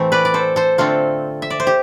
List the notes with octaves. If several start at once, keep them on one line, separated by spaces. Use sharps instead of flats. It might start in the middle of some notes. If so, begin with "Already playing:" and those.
Already playing: A2 E3 A3 C4
B4 D5
D5
A4 C5
A4 C5
D3 A3 C4 F4 A4
E5
D5
C5
G4